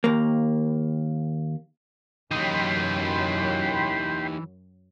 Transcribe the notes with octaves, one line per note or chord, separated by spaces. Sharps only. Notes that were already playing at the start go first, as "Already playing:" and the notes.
D#2 A#3
F#2 E3 D#4 G4 D#5 G5 B5 C6